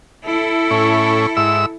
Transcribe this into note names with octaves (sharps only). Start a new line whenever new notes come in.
E4 A4
A2 C#4
G#2 E5 E6